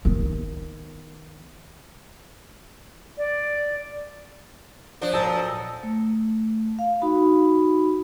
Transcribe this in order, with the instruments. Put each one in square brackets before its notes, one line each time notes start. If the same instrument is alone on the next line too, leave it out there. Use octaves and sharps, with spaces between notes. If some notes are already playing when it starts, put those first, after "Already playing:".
[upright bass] D#3 B3
[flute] D5
[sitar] F3 D4
[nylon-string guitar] A#2 C5 A5 [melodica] F#3 A4 D#5
[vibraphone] A3
F5
D#4 F#4 B5